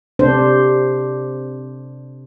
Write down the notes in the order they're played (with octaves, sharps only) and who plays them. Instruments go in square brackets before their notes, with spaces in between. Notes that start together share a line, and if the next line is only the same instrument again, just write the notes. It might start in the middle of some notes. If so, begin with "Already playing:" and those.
[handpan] C3 D4 C5